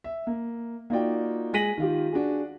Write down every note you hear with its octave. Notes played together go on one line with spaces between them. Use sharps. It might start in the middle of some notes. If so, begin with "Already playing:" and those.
E5
A#3
A#3 D#4 F4 F#4 D5 G5
G#3 G#5 A#6 B6 D#7 F#7
D#3 F4 G4
D4 F#4 G#4